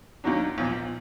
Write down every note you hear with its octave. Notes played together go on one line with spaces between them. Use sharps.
D#2 D#3 F#3 D4
B1 A#2 F3